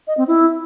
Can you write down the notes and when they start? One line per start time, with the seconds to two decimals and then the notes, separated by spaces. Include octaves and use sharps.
0.07 D#5
0.17 C4
0.28 E4